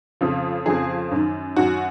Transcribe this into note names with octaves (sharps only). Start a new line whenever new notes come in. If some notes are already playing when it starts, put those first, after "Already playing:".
F2 C#3 F3
F2 C#3 F3 G#4
F#2 D#3
F#2 D#3 F#4